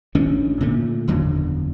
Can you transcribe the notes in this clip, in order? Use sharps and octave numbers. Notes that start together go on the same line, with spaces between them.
A1 D#3 C#4 D4
A#2 D3 A3
F#1 E2 D3 F#3